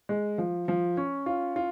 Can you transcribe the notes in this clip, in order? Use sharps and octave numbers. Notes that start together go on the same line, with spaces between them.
G#3
F3
F3
C#4
F4
F4